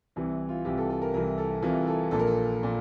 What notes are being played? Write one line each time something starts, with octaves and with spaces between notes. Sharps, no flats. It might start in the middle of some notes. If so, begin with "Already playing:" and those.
C2 C3 E3
F4
C2 C3 E3 G4
A4
A4
A#4
C2 C3 E3 A#4
A4
C2 C3 E3 F4
A4
A#1 A#2 A4
A#4
A4
A#2